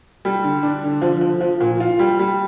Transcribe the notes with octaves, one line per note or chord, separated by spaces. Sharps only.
G3
D3
D4
D3
F3
F3
F3
A#2
F4
G3
G3